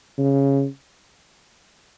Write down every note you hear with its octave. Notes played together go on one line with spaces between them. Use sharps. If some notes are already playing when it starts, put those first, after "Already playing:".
C#3